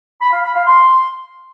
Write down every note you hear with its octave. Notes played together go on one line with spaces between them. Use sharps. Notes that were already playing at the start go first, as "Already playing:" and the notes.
B5
F5
B5
F5
C6